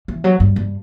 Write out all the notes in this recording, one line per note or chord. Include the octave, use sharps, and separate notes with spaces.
E3
F#3
G2
G2